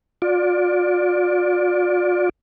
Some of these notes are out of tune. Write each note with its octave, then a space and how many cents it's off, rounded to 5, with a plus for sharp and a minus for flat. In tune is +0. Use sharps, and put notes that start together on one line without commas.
F4 +40 D5 +0